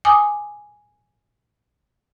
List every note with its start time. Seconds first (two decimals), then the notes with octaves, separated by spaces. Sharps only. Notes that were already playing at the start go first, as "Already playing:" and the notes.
0.05 G#5 D6 D#6